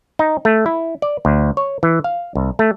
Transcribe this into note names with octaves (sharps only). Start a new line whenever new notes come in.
D#4
A3
E4
D5
D2
C#5
E3
F5
C2
A3